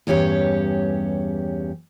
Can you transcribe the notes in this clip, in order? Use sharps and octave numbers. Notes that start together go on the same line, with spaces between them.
E2 G2 C#4 G4 C#5